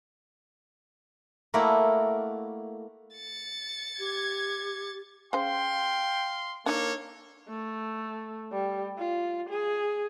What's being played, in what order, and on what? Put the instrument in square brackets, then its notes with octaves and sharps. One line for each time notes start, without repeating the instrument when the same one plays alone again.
[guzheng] A3 A#3 E4 F#4 A#4 D5
[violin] A6 C#7
[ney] G4 [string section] G#6
[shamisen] C#3 C5 [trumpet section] F5 C6 [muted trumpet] G5
[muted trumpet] A#3 [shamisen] D4 D#4 [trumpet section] A4 C#5
[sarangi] A3
G3
F4
G#4